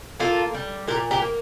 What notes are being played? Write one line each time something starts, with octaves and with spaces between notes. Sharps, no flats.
A#3 F4 A4
G3
A#2 G4 A#4
G4 A#4
A#3